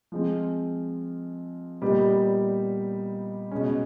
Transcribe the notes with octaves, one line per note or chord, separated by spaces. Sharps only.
F3 G#3 C4 F4
A#2 G3 B3 D#4 G4
B2 G#3 C#4